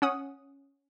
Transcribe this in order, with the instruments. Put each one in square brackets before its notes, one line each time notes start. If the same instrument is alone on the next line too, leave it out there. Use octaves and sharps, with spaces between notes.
[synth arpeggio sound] C#4 F#5 D#6